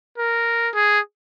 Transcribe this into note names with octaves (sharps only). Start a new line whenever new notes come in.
A#4
G#4